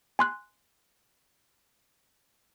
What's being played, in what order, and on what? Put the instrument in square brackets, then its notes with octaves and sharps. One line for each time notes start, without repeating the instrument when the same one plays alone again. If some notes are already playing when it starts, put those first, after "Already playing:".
[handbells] G#5 C6 F#6